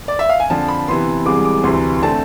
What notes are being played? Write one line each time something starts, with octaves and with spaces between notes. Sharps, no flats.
D5
E5
F5
G#5
F2 D3 F3 A5
B5
C3 E3 B3 C6
C2 C3 E3 G#3 D6
D6
D2 C3 E3 C6
D3 A3 C4 A5